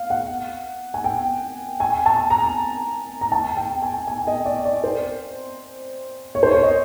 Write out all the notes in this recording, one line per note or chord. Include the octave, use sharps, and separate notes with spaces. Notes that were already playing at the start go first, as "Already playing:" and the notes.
Already playing: F5
F#5
G#5
G5
G#5
A5
A#5
A#5
A5
G5
G#5
G#5
D#5
D5
D5
C5
C#5
C5
C#5
D#5